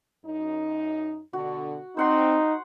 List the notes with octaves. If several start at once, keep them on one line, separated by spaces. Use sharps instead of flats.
F#2 D#4
B2 D3 F#4
C4 D#4 C5 F#5 C6